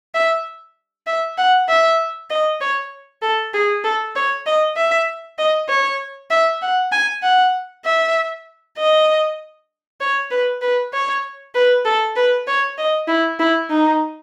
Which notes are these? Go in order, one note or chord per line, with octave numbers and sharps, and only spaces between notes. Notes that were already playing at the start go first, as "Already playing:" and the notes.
E5
E5
F#5
E5
D#5
C#5
A4
G#4
A4
C#5
D#5
E5
D#5
C#5
E5
F#5
G#5
F#5
E5
D#5
C#5
B4
B4
C#5
B4
A4
B4
C#5
D#5
E4
E4
D#4